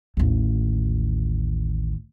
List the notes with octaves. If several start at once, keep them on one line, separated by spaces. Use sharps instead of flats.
A1 D#2